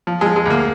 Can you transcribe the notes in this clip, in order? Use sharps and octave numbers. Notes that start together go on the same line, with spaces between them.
F3
F3 G#3
G#3
D2 A#3